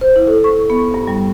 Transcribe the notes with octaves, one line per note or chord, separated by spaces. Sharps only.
C5
E4
A4
C#6
B3
G2
G3